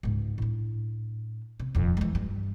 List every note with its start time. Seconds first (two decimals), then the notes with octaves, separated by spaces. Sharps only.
0.03 C#2 G#2
0.38 A2 D4
1.60 C3
1.75 D#1 F2
1.97 E3 G#3
2.15 G2